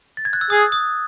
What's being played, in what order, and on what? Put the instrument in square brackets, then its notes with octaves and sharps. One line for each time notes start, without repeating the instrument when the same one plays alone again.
[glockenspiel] A6
G#6
F#6
E6
[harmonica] G#4 [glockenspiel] D#6
[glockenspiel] D#6